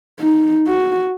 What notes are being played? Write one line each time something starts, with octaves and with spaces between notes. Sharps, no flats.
D#4
F#4